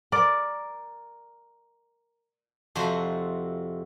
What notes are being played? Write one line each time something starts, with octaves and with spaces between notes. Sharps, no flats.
A#4 D5
F2 C3 F#4 C5 E5 C6